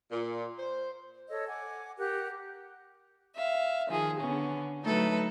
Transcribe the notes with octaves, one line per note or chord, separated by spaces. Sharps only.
A#2
C5
A4 C#5 D#5 E6
F#5 G#5 D6
G4 A#4 F#5 F#6
E5 F5
D#3 F3 G#4
D3 B3 C#4
F#3 A3 D#4 A4 B4